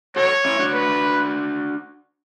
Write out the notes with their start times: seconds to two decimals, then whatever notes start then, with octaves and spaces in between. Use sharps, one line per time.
0.16 F#4 A4 C#5
0.45 C#4 E4
0.59 D4 F#4
0.73 B4